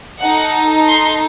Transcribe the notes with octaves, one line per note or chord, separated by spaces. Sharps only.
D#4 A4 F#5
C6